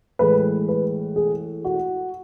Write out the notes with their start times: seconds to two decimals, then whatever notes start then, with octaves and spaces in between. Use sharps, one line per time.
0.19 A2 E3 G#3 B4
0.69 B4
1.16 G#4
1.65 F#4